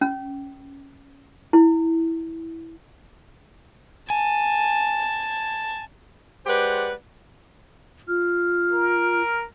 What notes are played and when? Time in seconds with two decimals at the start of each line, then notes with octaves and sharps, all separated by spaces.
0.01 C#4
1.53 E4
4.10 G#5 A5
6.46 G#3 G4 B4 C5 D5 F#5
8.08 F4 F6
8.72 A#4